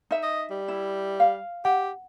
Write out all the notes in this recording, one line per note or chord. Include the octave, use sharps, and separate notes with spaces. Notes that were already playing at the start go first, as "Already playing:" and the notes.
D#4 E5
D#5
G3
E4
F5
G4 F#5